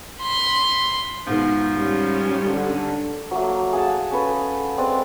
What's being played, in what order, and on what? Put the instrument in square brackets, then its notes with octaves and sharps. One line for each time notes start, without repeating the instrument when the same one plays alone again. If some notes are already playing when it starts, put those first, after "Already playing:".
[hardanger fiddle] B5 C6
[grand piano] G#2 B2 D#3 [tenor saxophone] F3
[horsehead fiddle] G3 C#4
[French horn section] D3
[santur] F#3 A3 A#3
G#4 F5 F#5 A5
C#4 A4 B4
G#3 C4 B4 D5